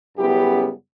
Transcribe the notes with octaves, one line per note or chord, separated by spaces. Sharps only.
F#2 C#3 G3 B3 E4 G4